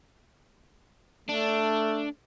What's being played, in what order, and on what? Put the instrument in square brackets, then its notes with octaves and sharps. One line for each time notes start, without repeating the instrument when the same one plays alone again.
[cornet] A3 [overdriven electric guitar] D4